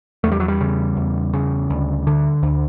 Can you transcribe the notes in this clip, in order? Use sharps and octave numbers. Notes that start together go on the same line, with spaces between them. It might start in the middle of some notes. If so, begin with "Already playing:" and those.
E2 A3
G3
F#3
G3
C#3
E2
C#3
D2
D3
D2